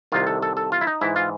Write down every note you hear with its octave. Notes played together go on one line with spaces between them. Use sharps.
C2 C3 D#3 F4
A4
A4
A4
F4
E4
D#4
G#2 E3 E4
F4